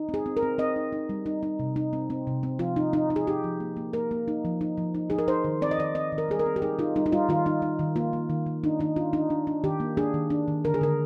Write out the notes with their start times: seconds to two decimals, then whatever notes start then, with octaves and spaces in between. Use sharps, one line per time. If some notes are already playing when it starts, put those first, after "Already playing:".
Already playing: D#4
0.09 C4
0.14 G#4
0.26 C4
0.37 A#4
0.43 C4
0.58 C4 D#5
0.76 D#4
0.92 D#4
1.09 G3
1.26 D#4
1.43 D#4
1.59 C3
1.76 D#4
1.93 C4
2.10 C4
2.27 C3
2.43 C4
2.59 F3 F4
2.76 D#4
2.93 D#4
3.10 D#4
3.16 G#4
3.27 D#4 G4
3.44 F3
3.60 A#3
3.77 A#3
3.93 A#3 A#4
4.11 A#3
4.28 D#4
4.45 F3
4.61 D#4
4.78 F3
4.95 D#4
5.10 D#4 G#4
5.19 A#4
5.28 D#4 C5
5.44 D#3
5.62 C4 D5
5.71 D#5
5.78 D#3 D5
5.95 C4 D#5
6.12 D#3
6.18 A#4
6.29 G3 G#4
6.39 A#4
6.46 C4
6.56 G4
6.62 D#4 G#4
6.79 D#4 F4
6.96 G3 D#4
7.06 D#4
7.12 G3 F4
7.29 D#3 F4
7.46 D#4
7.62 D#4
7.79 D#3
7.96 A#3 F4
8.13 A#3
8.30 D#3
8.46 D#3
8.64 D4 D#4
8.79 D#3 D#4
8.96 D4 F4
9.13 D4 D#4
9.30 D4
9.47 D4
9.64 D#3 G4
9.80 A#3
9.97 D4 G#4
10.14 D#3
10.30 D4
10.48 D#3
10.65 D3 A#4
10.74 G#4
10.81 D3 A#4